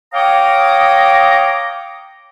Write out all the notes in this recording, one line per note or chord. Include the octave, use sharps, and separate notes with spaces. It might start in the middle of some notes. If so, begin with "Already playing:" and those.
C#5 F5 G5 A#5 D6 D#6